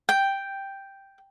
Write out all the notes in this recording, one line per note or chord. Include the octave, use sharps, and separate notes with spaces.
G5